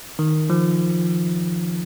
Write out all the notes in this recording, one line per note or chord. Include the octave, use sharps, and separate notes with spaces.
D#3
F3